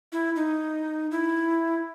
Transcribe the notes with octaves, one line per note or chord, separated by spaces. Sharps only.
E4
D#4
E4